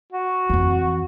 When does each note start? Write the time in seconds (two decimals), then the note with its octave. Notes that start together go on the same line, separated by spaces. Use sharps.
0.13 F#4
0.49 F2 E3